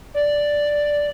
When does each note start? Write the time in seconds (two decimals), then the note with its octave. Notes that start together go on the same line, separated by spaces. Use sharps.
0.14 D5